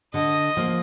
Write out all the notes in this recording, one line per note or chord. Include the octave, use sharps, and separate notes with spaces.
D3 D#5
F3 A#3